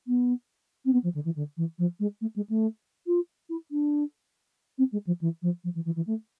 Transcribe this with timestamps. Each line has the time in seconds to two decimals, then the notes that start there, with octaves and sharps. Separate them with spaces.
0.07 B3
0.85 C4
0.92 B3
1.03 F3
1.14 D3
1.25 E3
1.35 D3
1.57 E3
1.78 F3
1.99 G#3
2.21 A3
2.36 G#3
2.49 A3
3.06 F4
3.49 E4
3.71 D4
4.78 C4
4.92 G#3
5.06 F3
5.21 E3
5.42 F3
5.64 F3
5.75 E3
5.85 E3
5.96 E3
6.06 A3